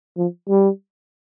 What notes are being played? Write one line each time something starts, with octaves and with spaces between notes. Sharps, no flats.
F3
G3